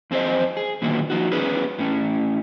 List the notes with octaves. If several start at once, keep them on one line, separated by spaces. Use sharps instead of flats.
F2 C4 G#4 C5 D#5
G#4
A#2 D3 D#3 F#3 A#3 B3
F3 D#4 F#4
B3 C#4 G#4 B4
A2 C#4